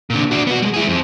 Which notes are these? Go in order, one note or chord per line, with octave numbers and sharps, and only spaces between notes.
A#2 D3
D4 F#4
B3 F#4
G3 G#3
E4 G#4
F2